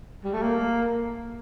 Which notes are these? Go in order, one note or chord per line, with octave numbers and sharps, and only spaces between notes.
G3
A3
A#3